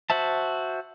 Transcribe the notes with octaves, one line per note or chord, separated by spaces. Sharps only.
F#4 C5 E5 A5